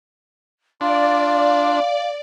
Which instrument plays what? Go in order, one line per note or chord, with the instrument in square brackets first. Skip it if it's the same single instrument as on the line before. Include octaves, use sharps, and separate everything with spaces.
[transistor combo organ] D4 [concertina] F4 [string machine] D5 [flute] F5